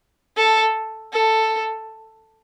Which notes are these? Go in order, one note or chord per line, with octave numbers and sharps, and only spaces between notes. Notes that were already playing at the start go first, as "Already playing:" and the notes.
A4
A4